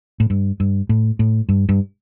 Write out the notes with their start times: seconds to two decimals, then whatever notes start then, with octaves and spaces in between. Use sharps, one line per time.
0.20 A2
0.30 G2
0.60 G2
0.89 A2
1.19 A2
1.49 G2
1.69 G2